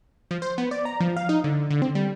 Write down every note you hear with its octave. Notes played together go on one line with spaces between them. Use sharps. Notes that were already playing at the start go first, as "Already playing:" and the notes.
F3
C5
B3
D5
A#5
F3
F5
D#4
D3
D3
C4
G3